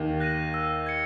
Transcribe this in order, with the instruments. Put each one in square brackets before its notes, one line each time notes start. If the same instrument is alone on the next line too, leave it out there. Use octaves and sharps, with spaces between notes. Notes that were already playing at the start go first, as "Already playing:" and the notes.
Already playing: [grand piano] D#2 D#3
[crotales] F#6 A#6 D#7
E6
G#6 C#7